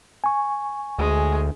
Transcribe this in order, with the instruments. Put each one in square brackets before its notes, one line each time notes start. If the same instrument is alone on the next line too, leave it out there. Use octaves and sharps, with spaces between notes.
[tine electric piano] G#5 C#6
[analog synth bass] D2 [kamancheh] G#3